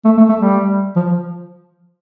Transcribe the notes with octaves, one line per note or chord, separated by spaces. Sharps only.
A3
A3
A3
G3
F3